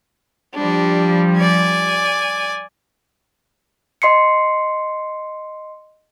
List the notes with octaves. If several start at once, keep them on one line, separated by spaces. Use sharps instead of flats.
F3 G3 D4
D5 G#5
D#5 C6 C7 C#7